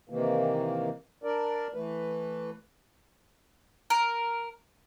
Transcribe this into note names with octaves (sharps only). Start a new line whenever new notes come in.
C3 D#3 E3 A#3
D4 A#4 D5
E3 A3 B4
A#4